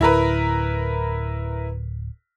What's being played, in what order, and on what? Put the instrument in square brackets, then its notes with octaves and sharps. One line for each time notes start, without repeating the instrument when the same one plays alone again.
[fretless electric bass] D1 [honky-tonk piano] E4 A#4 B4